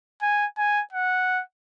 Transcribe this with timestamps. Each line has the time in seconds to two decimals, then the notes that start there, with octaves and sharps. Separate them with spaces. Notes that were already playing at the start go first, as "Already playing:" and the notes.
0.22 G#5
0.58 G#5
0.93 F#5